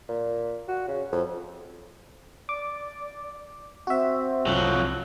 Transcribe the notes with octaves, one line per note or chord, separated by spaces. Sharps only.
A#2
F#4
C#3
F2
D5 D6
C4 F#4 E5
C2 F2 F#3